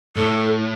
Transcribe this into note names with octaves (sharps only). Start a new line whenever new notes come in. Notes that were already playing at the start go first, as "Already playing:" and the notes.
A2 A4